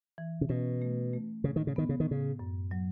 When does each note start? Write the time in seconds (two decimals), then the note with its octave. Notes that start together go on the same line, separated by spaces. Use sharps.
0.18 E3
0.41 C#3
0.49 B2 C#4
0.82 A3
1.13 A3
1.44 A2 C#3
1.56 D#3
1.67 C#3
1.76 D#3 B3
1.89 C#3
2.00 D#3
2.08 A2 C#3
2.39 F#2
2.71 F#3